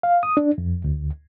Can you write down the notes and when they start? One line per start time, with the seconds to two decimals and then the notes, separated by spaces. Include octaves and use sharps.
0.03 F5
0.23 D#6
0.37 D4
0.58 F2
0.84 D2